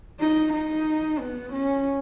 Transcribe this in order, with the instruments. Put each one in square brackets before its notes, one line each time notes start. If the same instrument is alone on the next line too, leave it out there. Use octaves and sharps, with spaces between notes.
[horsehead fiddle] D#4
D#4
B3
C#4